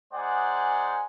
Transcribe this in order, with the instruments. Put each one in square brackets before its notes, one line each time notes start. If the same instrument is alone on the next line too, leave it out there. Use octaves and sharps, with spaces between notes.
[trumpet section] G#3 D#4 C5 D5 F#5 G#5